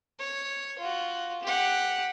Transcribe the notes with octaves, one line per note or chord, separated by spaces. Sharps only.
C#5
F4 F#4
G4 F#5